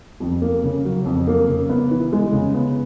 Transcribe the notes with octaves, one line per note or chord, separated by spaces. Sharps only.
F2
A#3
C#3
F#3
F2
A#3
C#3
B3
E3
G#3
C#3
B3